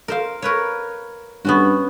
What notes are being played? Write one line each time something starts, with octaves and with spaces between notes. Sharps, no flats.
A#4 C5 F5
A#4 B4 C#5
G2 B3 C#4 F#4